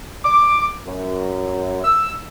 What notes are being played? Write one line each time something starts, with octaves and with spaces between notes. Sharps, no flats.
D6
F#2
E6